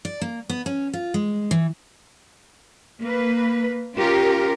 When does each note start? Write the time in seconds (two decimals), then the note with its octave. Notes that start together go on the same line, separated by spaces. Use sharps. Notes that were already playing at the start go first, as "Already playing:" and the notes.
0.05 D5
0.22 A#3
0.50 B3
0.66 C#4
0.93 F4
1.14 G#3
1.51 E3
3.04 A#3 B4
3.98 C#4 F4 G4 A#4